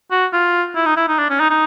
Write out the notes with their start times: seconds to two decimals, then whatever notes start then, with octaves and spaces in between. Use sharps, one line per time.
0.11 F#4
0.33 F4
0.76 E4
0.86 D#4
0.97 E4
1.08 D#4
1.19 D4
1.30 C#4
1.40 D#4
1.50 D#4